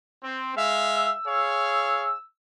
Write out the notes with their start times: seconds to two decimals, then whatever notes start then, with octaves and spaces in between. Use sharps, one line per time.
0.23 C4
0.56 G#3 E5 F5
0.95 E6
1.26 G#4 C#5 F5